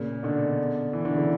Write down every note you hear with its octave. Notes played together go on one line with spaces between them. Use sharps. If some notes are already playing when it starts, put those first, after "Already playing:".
Already playing: A#2 C#3
B2 D3
E3
D3
C#3 E3